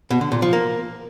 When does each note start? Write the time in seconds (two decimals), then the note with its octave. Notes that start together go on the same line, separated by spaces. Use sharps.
0.11 B2
0.21 D3
0.32 A#2
0.42 F3
0.53 A#3